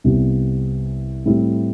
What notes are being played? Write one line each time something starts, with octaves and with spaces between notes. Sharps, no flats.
C2 C3 G3 B3
A2 G3 C4 E4